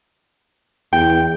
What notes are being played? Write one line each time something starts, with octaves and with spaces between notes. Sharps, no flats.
E2 G5